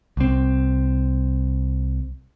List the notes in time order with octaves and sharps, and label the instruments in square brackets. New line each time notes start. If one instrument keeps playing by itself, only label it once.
[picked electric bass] C2 C4